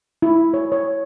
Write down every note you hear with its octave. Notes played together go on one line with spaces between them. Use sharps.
E4
C#5
C#5